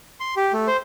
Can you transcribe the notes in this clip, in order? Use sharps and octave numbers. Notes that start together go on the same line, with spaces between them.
C6
G4
A3
C5